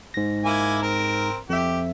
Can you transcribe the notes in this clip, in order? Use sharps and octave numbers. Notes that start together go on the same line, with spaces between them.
G#2 A#6
A#3 E4 G#5
C4 A#4
F2 G4 E5